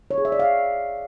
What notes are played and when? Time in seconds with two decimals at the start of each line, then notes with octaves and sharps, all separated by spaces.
0.11 C#5
0.18 G#4
0.25 E5
0.32 D5
0.39 F5